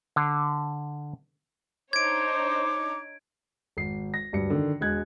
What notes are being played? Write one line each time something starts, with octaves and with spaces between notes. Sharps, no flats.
D3
D4 D#4 C5 C#5 D6 G#6 D7
G#1 C7
A#6
D1 G2 C#7
D3 D#3
E1 G#3 F#6 G#6